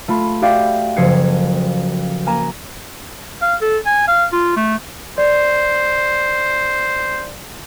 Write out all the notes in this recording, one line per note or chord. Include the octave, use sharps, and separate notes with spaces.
A3 F4 B5
F#4 G4 D5 E5 F5 G5
F#1 F3 A4 G#6 C7 C#7
A#3 G#5 A#5 E7
F5
A4
G#5
F5
F4
A3
C5 D5